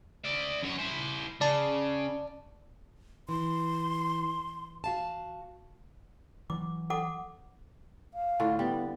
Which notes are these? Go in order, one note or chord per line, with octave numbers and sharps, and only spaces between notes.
D5 E5
F#2 C#5
E4 C5
C#3 D5 A5
E3 C6
F#4 F5 A5
E3 F#3 D6
A4 F#5 D6
F5
A2 D3 F4
G3 B3